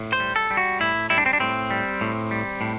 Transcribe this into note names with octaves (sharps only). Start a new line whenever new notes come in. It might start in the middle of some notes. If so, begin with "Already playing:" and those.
Already playing: A2
C5
G3
A4
G3
F#4
A2 E4
G3 E4
D4
C4
D4
A2 C4
G3
A2
G3
A2